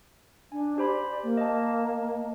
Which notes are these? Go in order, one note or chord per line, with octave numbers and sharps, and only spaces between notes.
D4 G#5
G4 C5 D5 B5
A#3
D#5 A5